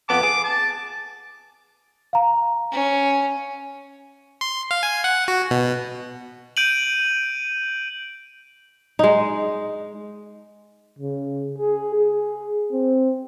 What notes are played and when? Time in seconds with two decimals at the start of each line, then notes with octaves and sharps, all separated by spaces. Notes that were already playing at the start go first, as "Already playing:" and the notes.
0.09 F2 B3 A5 D6
0.23 G#4
0.44 A5
2.13 F5 A#5
2.71 C#4
4.41 C6
4.71 F5
4.83 G#5
5.04 F#5
5.28 F#4
5.51 B2
6.57 G6 D7 D#7 F#7
8.99 G#3 D#4
10.99 C#3
11.58 G#4
11.95 G#4
12.72 C4